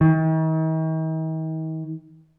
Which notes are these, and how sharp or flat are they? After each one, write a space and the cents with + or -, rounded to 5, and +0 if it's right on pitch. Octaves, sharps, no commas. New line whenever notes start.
D#3 +45